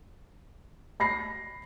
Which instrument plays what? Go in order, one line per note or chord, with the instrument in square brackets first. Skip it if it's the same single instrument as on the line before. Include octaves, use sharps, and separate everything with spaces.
[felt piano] B5 A#6 C7